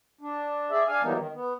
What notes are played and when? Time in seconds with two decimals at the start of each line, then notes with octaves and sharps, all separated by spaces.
0.21 D4
0.71 G#4 D5 E5
0.88 D4 F5 G#5
1.02 E3 F#3 G3 A#3 B3 D#4
1.16 D#3
1.34 B3